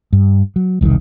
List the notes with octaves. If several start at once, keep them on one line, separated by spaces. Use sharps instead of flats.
G2
F#3
E1 C2 D3 D#3